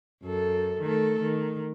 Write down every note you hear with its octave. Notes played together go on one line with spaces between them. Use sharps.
F#2 A4
D#3 A3 A4
D#3